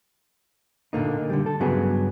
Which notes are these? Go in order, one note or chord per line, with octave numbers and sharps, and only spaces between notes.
A#2 D3 A#3 D#4
D3 G3
A4
G2 C#3 F#3 B3 G#4